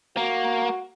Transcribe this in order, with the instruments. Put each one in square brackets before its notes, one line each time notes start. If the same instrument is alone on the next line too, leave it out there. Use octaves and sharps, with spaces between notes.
[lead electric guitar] A#3 [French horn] F#4